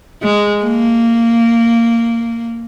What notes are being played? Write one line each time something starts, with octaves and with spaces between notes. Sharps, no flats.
G#3
A#3